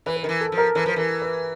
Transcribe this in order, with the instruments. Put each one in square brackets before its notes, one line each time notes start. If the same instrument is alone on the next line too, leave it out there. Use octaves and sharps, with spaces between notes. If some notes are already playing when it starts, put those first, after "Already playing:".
[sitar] E3 [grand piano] B4
[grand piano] B4
[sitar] D#3 [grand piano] A#4
[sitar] E3
[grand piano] A4
[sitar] F3
[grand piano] A#4
[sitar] E3 [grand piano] B4
[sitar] F3 [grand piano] B4
[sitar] E3 [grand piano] A#4
[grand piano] B4